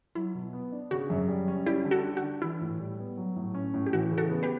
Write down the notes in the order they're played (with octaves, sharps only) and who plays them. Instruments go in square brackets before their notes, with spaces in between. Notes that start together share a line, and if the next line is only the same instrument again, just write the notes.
[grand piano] F#3 [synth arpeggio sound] E4
[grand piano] B2
B3
D4
[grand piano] C#3 [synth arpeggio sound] F#4
[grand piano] F#2
G3
C#4
[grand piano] G3 [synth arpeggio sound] E4 G4
[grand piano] D3
[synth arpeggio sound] F#4 A4
[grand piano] D4
[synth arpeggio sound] F#4
[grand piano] D3
[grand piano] E3 [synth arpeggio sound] E4
[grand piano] A2
G3
B3
F#3
A2
C#4
A2
[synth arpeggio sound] G4
[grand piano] E3 [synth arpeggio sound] F#4
[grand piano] C#3
[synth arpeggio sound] F#4 A4
[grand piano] B3
[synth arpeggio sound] G4 B4